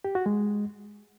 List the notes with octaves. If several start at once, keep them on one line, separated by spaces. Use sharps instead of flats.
G4
F#4
G#3